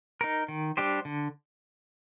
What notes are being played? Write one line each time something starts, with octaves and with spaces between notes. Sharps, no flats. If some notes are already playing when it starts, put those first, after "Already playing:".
D#4 A#4
D#3
G3 D4 G4 C5
D3